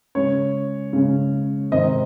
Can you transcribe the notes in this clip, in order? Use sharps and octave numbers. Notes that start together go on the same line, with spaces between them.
C#3 G#3 C#4 C#5
C#3 G#3 C#4
C3 D#3 G#3 C4 D#5